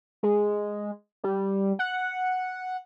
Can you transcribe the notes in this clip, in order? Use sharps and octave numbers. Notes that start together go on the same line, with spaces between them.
G#3
G3
F#5